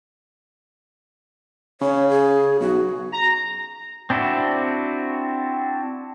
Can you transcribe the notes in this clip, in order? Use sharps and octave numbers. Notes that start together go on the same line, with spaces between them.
C#3 C#5
G#4
B1 F#4
A#5
C4 D4 E4 F#4